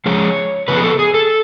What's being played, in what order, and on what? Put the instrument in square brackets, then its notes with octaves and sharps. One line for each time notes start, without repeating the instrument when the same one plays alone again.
[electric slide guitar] F3 G#3 C#4 C#5
C#3 F3 B3 B4
G#4
A4
G#4
A4